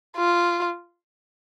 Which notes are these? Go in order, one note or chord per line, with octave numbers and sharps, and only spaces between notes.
F4